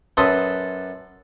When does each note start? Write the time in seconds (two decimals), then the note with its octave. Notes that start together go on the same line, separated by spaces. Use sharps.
0.17 F#2 A4 B4 C6 D#6